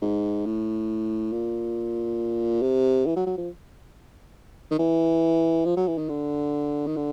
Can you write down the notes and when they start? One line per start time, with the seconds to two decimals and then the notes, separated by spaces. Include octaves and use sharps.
0.01 G#2
0.46 A2
1.32 A#2
2.62 C3
3.06 E3
3.16 F#3
3.26 F#3
3.37 F3
4.71 D#3
4.78 E3
5.65 F3
5.76 F#3
5.88 E3
5.98 D#3
6.09 D3
6.86 D#3
6.96 D3